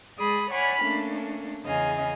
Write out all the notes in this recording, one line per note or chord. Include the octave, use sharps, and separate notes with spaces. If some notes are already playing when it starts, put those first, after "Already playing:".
G#3 G#4 D5 B5 D#6
C#5 D5 F#5 G#5 B5 F6
A3 A#3 C#4 D4
E2 C#3 C#4 D#5 F5 G#5